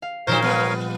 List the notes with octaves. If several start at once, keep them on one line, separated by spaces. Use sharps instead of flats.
F5
A#2 F3 F#3 D#4 A#4 C5 C#5 F5
G3 B3